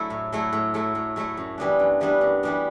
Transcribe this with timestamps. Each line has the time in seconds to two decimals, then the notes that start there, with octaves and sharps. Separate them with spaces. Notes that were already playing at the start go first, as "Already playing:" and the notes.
Already playing: F#3 A3 E4 A4
0.10 A2
0.32 F#3 A3 E4 A4
0.53 A2
0.74 F#3 A3 E4 A4
0.95 A2
1.16 F#3 A3 E4 A4
1.37 F#2
1.58 E3 G3 B3 D4
1.79 F#2
2.01 E3 G3 B3 D4
2.21 F#2
2.43 E3 G3 B3 D4